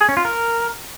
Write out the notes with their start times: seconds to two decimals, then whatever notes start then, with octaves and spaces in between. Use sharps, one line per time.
0.01 G#4
0.09 C#4
0.17 F4
0.25 A#4